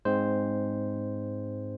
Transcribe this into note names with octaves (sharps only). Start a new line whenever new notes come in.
G#2 G#3 C4 C5